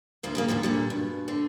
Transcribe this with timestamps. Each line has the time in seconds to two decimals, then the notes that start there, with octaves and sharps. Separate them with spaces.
0.23 D2 F3 A#3
0.35 C#3 G#3 A#3
0.48 D#2 A#2 D#3 F3
0.63 A#2 D3 G3
0.90 G2 B2
1.28 D3 C4